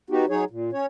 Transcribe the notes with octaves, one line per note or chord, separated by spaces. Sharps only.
B3 D#4 F#4 G4
F#3 D#4 G#4 C#5
A#2
C#4 C#5